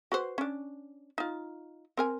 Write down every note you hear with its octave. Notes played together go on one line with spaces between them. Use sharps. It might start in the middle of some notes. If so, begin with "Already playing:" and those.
F#4 B4 C5
C#4 D4
D#4 F4
C4 A#4 G#5